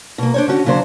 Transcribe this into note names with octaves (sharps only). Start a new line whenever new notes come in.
B2 A#3
D4 C5 C#5
D3 C#4 F#4
D#2 C#3 F#3 D4 C5